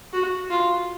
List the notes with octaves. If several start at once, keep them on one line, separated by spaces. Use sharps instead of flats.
F#4
F4